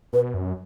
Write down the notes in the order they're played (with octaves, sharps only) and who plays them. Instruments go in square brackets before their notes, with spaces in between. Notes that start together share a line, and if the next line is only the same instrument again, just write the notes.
[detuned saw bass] B2 [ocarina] B4
[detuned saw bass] F#2